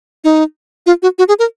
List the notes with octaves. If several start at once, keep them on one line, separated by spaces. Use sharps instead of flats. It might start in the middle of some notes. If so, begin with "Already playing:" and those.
D#4
F4
F#4
F#4
G#4
A#4